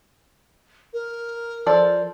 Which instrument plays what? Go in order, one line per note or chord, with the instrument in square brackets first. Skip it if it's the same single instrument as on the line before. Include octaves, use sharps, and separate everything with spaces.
[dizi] A#4
[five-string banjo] F3 A4 D5